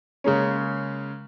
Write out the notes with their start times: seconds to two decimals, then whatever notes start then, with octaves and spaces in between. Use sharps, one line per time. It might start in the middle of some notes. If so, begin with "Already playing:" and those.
0.24 C#3 G#3 A#3 C#4